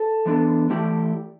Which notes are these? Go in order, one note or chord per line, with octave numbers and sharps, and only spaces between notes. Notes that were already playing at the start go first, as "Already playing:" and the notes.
Already playing: A4
E3 B3 D4 A4
E3 A3 E4 G4 D5